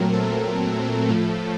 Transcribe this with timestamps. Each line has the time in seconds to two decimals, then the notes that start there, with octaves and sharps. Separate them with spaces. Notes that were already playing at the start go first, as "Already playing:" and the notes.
Already playing: A#2 F#3 A3 C4 A#4
0.13 A4
1.09 A2 F3 A3